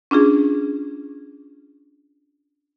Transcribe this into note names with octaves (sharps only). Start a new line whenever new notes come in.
C#4 D4 F4 G#4